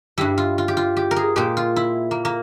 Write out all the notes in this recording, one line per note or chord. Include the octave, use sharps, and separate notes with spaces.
G2 G3 E4
F4
F4
G4
F4
G4
A#4
G#4
A#2 G#3 G4
F4
E4
A#3
A#3